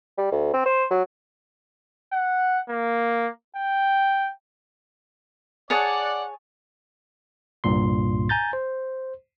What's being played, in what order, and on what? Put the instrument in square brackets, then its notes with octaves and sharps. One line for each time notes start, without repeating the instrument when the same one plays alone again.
[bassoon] G3
D2
C4
C5
F#3
[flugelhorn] F#5
A#3
G5
[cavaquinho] G#4 C#5 A5 [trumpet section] D5 F#5
[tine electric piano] C2 G2 A#2 C6
G#5 A#5 G6 A6
C5